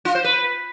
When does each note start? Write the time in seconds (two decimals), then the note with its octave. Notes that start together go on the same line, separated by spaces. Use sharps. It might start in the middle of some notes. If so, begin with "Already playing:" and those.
0.05 F4
0.15 C5
0.24 B4